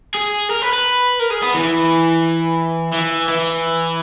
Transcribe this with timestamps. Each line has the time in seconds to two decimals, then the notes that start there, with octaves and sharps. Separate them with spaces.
0.15 G#4
0.50 A#4
0.62 B4
0.73 B4
1.20 A#4
1.31 G#4
1.43 B3
1.54 E3
2.93 E3
3.28 E3